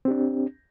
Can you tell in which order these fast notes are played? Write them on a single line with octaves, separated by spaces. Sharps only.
C4 G4 D4